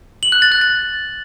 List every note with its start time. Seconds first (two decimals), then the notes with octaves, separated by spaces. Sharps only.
0.23 F#7
0.32 F#6
0.42 A6
0.52 F#6
0.61 A6